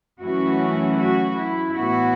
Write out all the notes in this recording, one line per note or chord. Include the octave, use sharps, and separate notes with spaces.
F#2 E3 A3 C#4 E4 F#4
F#4
E4
A2 E3 B3 E4 F#4